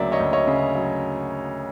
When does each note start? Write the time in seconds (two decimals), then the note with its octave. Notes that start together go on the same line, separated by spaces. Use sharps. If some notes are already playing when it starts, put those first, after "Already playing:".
Already playing: D2 C#3 F#3 A#3 D5 E5
0.12 C#5 D#5
0.20 D2
0.33 C#5 D#5
0.47 C#3
0.75 F#3